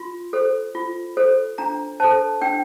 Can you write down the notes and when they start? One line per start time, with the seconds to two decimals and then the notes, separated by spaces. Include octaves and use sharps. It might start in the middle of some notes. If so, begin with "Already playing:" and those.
Already playing: F4 C6
0.33 A4 C5
0.75 F4
1.17 A4 C5
1.58 D4 A#5
2.00 A4 C5 A5
2.41 D4 G5